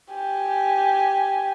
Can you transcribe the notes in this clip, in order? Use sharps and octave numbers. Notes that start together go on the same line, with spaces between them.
G4 G#5